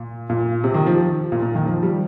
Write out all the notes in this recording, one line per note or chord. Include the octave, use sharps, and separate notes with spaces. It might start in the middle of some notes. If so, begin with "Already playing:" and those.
Already playing: A#2
A#2
C3
D#3
F3
A#2
A#2
D#3
F3
G3